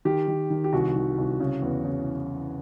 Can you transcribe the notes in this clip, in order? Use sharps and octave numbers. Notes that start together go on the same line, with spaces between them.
D#3 G4
D#3
D#3
G4
C2 F#4
D#3
C2
C#3
E2
C#3